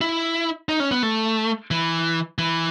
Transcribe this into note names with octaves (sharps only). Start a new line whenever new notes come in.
E4
D#4
C#4
B3
A3
E3
E3